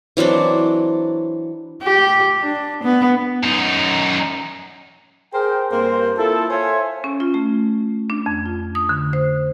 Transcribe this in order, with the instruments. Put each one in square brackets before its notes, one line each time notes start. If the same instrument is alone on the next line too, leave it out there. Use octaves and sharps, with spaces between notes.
[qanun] E3 F#3 C4 D4
[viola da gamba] G4
D4
B3
[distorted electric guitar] F#2 D#4
[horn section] G#4 A#4 C5 G5
G2 A#3 C4 C5
A#3 E4 F4 A4
A4 C5 C#5 E5 F5 G#5
[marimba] C#4
F4
A3
D4
F2
F4
D#6
D3
C5